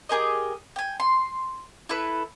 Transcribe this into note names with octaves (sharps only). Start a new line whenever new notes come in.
G4 G#4 A#4 D#5
G5 G#5
C6
E4 A4 B4